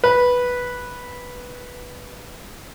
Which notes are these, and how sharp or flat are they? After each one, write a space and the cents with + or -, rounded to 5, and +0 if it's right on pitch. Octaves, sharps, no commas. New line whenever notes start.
B4 -5